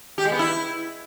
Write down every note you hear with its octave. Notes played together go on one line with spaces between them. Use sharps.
G4
G#3
B3
E4